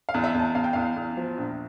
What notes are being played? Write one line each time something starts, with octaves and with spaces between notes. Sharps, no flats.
F5
E2
E5
E2
A5
E2 F5
G5
E2 F5
E2
F3
A#1